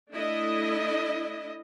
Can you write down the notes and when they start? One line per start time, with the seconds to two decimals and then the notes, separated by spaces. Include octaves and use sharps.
0.11 A3 D4 E4 D#5